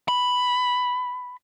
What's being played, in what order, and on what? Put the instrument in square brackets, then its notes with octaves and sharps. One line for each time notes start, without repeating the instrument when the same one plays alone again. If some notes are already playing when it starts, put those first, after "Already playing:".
[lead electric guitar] B5